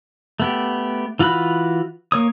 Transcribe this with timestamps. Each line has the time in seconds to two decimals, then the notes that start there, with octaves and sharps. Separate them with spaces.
0.40 A3 B3 G4
1.19 E3 F4 F#4 B5 F#6
2.12 A#3 C#5 D#6